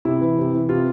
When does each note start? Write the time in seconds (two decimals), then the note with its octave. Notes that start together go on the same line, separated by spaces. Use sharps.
0.05 C3 E4
0.21 E3
0.38 C3
0.53 E3
0.69 C3 F4